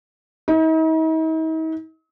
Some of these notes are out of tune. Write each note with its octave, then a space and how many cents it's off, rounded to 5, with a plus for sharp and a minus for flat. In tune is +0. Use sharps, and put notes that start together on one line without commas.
D#4 +45